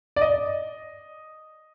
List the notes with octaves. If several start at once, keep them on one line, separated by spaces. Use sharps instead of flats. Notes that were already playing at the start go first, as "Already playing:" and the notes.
D5
D#5